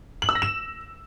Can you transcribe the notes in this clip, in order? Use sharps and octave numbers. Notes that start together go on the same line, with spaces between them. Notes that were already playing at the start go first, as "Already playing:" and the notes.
F#7
E6
A#6
E7